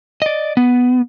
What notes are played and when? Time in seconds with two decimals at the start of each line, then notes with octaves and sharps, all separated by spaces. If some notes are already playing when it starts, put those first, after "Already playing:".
0.22 D5 D#5
0.57 B3